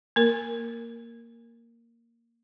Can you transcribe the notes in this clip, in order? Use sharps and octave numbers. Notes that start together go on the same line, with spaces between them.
A#3 A#4